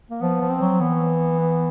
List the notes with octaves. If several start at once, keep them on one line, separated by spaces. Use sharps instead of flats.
A#3
F3 B3
F3
C4
F#3
E3 B3
B3